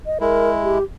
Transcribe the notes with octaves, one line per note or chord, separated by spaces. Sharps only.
D#5
G#3 E4 A#4
G4